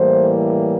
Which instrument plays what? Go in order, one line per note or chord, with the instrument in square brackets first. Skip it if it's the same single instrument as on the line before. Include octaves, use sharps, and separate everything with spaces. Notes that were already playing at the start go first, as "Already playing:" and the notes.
Already playing: [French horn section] A2 E3 G3 A#3 C5